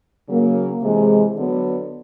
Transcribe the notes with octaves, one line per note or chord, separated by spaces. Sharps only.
C#3 F#3 A#3
C3 E3 G#3
D3 F#3 B3